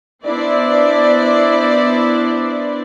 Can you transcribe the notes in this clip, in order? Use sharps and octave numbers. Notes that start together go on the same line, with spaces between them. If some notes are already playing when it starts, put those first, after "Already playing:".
B3 D4 E4 C5 D5